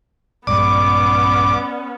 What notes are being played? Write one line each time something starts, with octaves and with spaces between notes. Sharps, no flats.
A#1 G2 G#3 B3 C#4 D5 D6